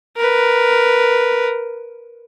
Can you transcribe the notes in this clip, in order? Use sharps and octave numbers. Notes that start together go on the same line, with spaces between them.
A#4 B4